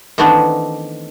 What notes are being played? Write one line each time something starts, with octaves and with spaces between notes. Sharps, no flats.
D#3 E3 A3 B3 C4 D4